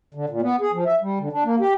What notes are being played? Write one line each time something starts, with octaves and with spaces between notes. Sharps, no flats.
D3
A#2
B3
G#4
F3
E5
G3
D3
D4
A#3
G4